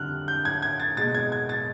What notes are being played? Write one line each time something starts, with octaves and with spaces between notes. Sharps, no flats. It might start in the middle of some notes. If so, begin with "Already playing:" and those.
Already playing: F2 D3 G3 F6 F#6
G6
G#6
G#6
A6
B2 G#3 A6
G#6
G#6
A6